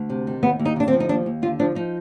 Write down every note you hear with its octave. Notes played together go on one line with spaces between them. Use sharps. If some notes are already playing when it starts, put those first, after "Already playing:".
Already playing: D2
C3
D#3
D#2 B3
D#2
D#4
D3 D4
C4
F3
D#4
D#2 D4
D#2
D3 F4
F3 D4
F3 D#4